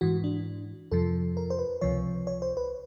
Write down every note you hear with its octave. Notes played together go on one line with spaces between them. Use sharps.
G#2 E3 F#4
D4
F2 C3 F3 A4
A#4
C5
B4
C#2 C3 F3 C#5
C#5
C5
B4